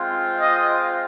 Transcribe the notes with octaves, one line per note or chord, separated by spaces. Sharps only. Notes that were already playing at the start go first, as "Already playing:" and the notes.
Already playing: G#3 C4 F4
D#5